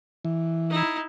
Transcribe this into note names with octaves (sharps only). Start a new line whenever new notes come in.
E3
D#4 E4